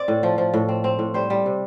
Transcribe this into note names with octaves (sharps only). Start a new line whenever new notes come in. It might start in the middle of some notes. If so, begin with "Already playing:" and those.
Already playing: C4 D5
A2
F3
F3
A2
C4
C4
A2
G3 C5
G3
C3